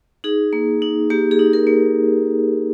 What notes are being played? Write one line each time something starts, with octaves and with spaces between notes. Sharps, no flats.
D#4 G#4
A#3
D#4
A#3 G4
G#4
D#4
A#4
A#3